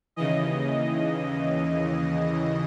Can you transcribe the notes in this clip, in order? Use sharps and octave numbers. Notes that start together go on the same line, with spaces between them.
D#2 C#3 E3 D#5